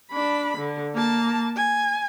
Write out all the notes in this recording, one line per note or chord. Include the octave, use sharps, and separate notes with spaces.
D4 B5
D3
A#3 A5
G#5